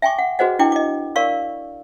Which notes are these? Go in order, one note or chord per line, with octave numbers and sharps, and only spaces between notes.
E5 G5 G#5 C#6 D6
F#5
F#4 G#4 B4 C5 D#5 F#5
D4 E4 D#5 G5 D6
D#5 D6
A#4 D5 F5 C#6 E6